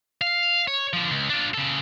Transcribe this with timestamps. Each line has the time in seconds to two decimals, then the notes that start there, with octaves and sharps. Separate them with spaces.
0.21 F5
0.68 C#5
0.93 D3 F3
1.11 C#2
1.30 D4 F4
1.54 C#3 A4